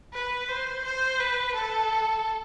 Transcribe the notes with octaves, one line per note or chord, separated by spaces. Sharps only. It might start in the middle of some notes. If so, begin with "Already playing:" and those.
B4
C5
C5
B4
A4